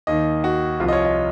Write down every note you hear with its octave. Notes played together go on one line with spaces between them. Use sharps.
D#2 D#3 D#5
F#4
C2 C3 F3 F4
D#5
C#5
D#5